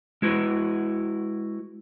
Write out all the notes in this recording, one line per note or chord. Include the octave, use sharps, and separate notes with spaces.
G#3 E4 F#4 B4